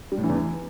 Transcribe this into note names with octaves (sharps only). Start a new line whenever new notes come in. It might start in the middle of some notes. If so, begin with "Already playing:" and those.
G3
A2
E3
E2
E3